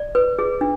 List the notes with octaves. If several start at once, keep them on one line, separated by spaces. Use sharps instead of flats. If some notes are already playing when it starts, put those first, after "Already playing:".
Already playing: D5
B4
G#4
D4